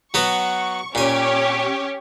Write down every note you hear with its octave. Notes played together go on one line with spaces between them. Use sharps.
F#3 B3 F#4 C#6
A#2 C#4 G4 C#5 G#5